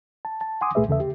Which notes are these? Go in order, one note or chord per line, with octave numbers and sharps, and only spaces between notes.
A5
A5
F#5 G#5 C6 D6 D#6
C2 A#2 A3 G#4 B4 E5
E2 C#3 A4 E5
G4